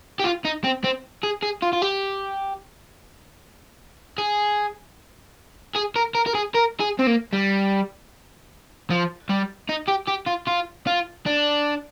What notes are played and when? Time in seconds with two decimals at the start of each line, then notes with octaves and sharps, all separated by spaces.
0.20 G4
0.24 F4
0.45 D#4
0.64 C4
0.84 C4
1.24 G#4
1.43 G#4
1.63 F4
1.73 F4
1.82 G4
4.18 G#4
5.75 G#4
5.96 A#4
6.15 A#4
6.26 A#4
6.35 G#4
6.54 A#4
6.80 G#4
6.99 C4
7.07 A#3
7.33 G3
8.91 F3
9.30 G3
9.69 D#4
9.88 G4
10.08 G4
10.27 F4
10.48 F4
10.87 F4
11.26 D4